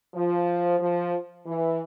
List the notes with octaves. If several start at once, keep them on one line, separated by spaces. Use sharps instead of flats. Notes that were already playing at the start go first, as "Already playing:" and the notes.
F3
F3
E3